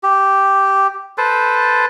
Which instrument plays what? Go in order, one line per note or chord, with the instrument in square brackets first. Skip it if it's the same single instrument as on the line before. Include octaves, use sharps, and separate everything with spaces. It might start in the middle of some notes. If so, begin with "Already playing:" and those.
[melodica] G4
A4 B4 C5